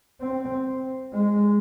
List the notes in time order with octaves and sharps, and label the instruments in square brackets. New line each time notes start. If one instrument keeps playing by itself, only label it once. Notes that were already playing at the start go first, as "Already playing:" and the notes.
[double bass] C4
G#3